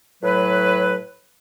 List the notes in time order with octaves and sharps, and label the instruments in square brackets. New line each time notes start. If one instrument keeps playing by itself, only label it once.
[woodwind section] A2 F#3 B4